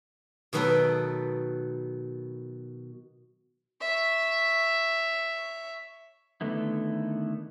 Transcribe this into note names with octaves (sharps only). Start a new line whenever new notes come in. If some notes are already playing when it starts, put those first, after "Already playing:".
B2 D#3 F#3 B3 A4 B4
C#5 E5
D3 D#3 A3 B3 E4